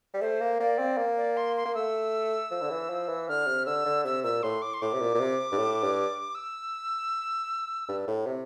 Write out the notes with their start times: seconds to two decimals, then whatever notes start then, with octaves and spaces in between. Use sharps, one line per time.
0.14 G3
0.21 A3 C5
0.41 A#3
0.60 A#3 D5
0.79 C4
0.98 A#3
1.18 D5
1.37 C6
1.56 C6
1.65 A#3
1.75 A3 E6
2.51 F3
2.62 D3
2.70 E3
2.90 F3
3.09 E3
3.28 D3 F6
3.47 C3
3.66 D3 E6
3.86 D3
4.05 C3 E6
4.24 A#2 E6
4.43 A2 C6
4.62 D6
4.74 C6
4.82 A2 D6
4.94 C3
5.01 A#2
5.15 A#2
5.20 C3
5.52 G2
5.58 A2
5.84 G2
6.35 E6
7.88 G2
8.08 A2
8.26 C3